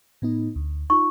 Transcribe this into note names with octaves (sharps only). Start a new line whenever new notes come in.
A2 B3 D#4
D2
D#4 F4 C#6